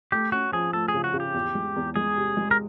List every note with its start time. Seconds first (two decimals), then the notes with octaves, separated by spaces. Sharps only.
0.12 A3 G4
0.32 C#4 F#4
0.52 F3 G#4
0.73 A3 A4
0.88 G#4
0.94 C#3
1.04 F#4
1.14 C#3
1.20 G4
1.34 E2
1.55 G#3
1.76 E2
1.96 G#3 G#4
2.17 C3
2.37 G#3
2.51 A#4